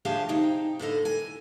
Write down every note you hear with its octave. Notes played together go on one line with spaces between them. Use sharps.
D2 F3 G4 G#4 F5 A5
C3 D#4 G5
A2 D3 A4 D#5
G#5